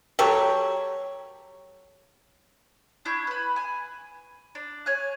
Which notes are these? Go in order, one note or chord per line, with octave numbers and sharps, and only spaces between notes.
F#3 G4 A4 C#5
D4 E4 C#6 G6
B4 B5
G#5
D4
C#5 G#5 F#6